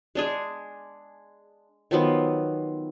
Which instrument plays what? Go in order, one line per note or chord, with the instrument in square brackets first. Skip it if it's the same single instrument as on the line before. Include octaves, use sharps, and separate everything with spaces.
[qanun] G#3 D4 G#4
D#3 F3 F#3 B3